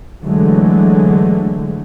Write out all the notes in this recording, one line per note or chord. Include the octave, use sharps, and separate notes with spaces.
D3 E3 F#3 G#3 A3